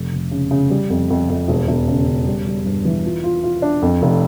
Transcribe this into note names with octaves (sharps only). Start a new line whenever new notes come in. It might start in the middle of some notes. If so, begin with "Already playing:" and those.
Already playing: F1
F1
C#3
C#3
G3
F2
F2
F2
E1
E1
C#3
C#3
G3
G3
G2
E3
F4
F4
F4
D4
F2
F1